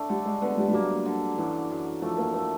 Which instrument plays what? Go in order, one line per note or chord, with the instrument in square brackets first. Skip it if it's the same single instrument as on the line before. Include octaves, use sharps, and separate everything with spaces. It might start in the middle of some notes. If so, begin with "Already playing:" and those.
Already playing: [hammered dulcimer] A2 A3 D4
[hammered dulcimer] D3 [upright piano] G3
[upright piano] G#3
[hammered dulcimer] D3 [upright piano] B3
[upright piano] G3
G3
[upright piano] F#3 [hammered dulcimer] A#3
[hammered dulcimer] D3
[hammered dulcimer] F#2 [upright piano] E3
[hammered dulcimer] F#2
[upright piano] F3 [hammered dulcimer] A3
[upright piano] A#3
[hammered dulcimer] A3 [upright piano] A#3